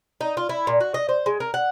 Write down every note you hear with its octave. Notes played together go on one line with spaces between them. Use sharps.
D#4
F4
E4
A#2
F#4
D#5
C5
G#3
A#4
F#5